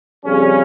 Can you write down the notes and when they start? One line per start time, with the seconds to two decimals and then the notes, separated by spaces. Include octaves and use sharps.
0.24 F2 C#3 G3 C#4